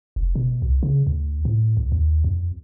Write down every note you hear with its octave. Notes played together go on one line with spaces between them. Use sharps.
F1
B2
C2
C#3
D2
A2
C#2
D#2
F2